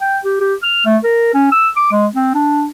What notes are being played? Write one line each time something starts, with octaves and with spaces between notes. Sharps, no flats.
G5
G4
G4
F6
A3
A#4
C#4
E6
D6
G#3
C4
D4